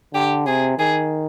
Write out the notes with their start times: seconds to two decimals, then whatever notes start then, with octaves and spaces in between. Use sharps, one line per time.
0.13 D3 G4
0.47 C3 G#4
0.78 D#3 G#4